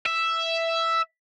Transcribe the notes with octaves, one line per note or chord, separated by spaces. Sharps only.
E5